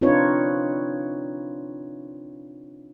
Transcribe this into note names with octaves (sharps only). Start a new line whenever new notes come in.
C4 D4 D#4 F4 B4 C#5